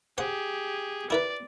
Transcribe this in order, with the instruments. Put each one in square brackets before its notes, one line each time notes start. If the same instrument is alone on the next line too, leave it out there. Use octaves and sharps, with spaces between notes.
[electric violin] G4 G#4 [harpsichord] C5 F#5
[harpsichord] E4 A#4 B4 [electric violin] D5